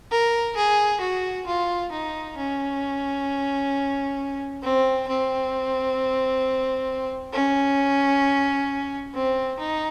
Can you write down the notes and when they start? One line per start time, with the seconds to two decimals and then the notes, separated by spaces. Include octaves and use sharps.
0.11 A#4
0.56 G#4
1.01 F#4
1.47 F4
1.92 D#4
2.37 C#4
4.63 C4
5.08 C4
7.33 C#4
9.14 C4
9.59 D#4